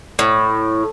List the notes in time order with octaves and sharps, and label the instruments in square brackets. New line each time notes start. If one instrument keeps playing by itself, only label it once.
[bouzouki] A2